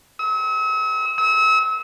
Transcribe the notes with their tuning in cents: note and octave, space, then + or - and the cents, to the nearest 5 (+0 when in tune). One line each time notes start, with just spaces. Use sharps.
E6 -40
E6 -35